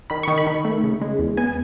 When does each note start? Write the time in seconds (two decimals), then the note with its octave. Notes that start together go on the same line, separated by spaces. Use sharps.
0.10 D#3 B5
0.23 D#3 C#6
0.38 B5
0.47 D#3
0.65 A3
0.84 C#3
1.01 G#3
1.19 E2
1.37 B3 G#5
1.47 G#5